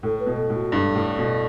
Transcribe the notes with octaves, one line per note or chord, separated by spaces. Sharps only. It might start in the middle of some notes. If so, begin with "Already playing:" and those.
A2 A4
B4
B2
A4
A2
F#4
G2 A4
A2
B2